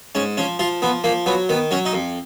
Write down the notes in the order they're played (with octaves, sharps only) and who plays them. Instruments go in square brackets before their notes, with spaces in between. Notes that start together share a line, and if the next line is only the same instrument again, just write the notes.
[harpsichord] G#2 C#4
F3 C#4
F3 F4
F3 B3
F3 A#3
F#3 B3
D#3 B3
F#3 C#4
D#4
F2